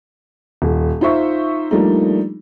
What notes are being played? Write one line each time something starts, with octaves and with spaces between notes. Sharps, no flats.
D#1
D#4 F4 C5 E5 C#6
F3 G3 A3 A#3 D4 D#4